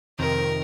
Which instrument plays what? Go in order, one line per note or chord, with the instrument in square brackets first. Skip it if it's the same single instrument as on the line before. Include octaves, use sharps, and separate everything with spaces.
[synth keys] F2 C3 D#3 [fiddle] A#4